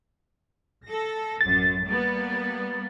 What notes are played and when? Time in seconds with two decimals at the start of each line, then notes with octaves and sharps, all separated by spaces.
0.85 A4 A#6
1.41 A1 F#2 A6
1.86 G3 A#3 B3